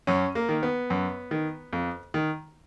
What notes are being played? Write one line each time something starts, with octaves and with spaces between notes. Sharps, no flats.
F#2 C#4
A#3
D#3
B3
F#2
D#3
F2
D#3